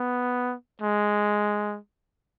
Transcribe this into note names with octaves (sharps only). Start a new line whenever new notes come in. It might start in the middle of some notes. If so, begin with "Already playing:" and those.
Already playing: B3
G#3